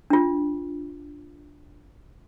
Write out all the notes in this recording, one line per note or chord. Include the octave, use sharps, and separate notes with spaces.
D4 F4